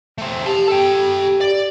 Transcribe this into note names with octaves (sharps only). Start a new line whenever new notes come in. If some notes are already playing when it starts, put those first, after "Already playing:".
A3 C4
G4 A5 C6
A4 G5
D5